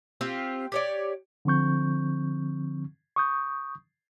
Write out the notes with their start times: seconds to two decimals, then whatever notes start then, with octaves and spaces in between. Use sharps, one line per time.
0.21 C4 F4 G4
0.72 G4 C#5 D5
1.45 D3 F3 C4 C#6 G6
3.16 C#6 D#6 G6